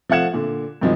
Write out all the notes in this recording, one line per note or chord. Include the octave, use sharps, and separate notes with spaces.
F3 A3 F5 F#5 G#6 E7
A#2 D3
G2 D#3 F3 F#3 G#3